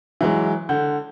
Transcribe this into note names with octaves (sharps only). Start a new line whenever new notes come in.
E3 F#3 G#3
D3 F#5 G6